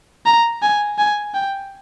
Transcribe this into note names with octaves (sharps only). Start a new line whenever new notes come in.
A#5
G#5
G#5
G5